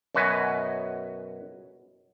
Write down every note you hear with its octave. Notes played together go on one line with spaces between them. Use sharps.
F#2 B2 F#4 B4 G#5